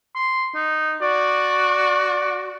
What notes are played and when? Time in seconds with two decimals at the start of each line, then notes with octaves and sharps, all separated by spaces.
0.15 C6
0.55 D#4
1.02 F#4 D5